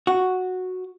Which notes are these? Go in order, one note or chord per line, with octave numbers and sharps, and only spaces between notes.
F#4